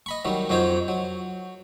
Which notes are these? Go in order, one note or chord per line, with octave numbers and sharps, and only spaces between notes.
D#5 B5 C#6
D#3 F#3 G3
F2 F#3 D#4 C5 C#5
F#3